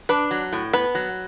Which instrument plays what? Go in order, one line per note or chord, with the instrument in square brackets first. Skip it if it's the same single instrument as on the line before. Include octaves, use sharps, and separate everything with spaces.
[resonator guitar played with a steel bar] D4 [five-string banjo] B4
[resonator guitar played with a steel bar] F#3
A2
[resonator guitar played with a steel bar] B3 [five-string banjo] B4
[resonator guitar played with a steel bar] F#3